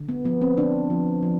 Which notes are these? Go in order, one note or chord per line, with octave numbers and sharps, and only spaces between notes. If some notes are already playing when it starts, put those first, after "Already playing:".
Already playing: D3
B3
F3 B3
C4
D3 D4
F3
F3